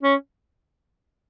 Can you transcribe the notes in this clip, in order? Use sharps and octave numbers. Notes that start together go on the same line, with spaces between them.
C#4